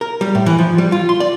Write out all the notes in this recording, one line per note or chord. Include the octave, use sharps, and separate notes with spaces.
A#4
G3
A2
E3
F3
G3
F4
C6
D5